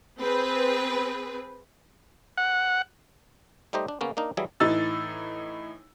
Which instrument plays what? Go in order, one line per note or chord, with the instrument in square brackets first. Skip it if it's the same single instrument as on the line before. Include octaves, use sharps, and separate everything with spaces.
[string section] C4 G#4 B4
[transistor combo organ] F#5
[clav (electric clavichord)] G3 A3 D#4 G4 C5 D#5
D4
C#3 A#3 B3 C#4
A#3 D4 D#4 A#4
E3 F#3 G3 E4 G#4
[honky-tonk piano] A2 E3 D#4 E6 A6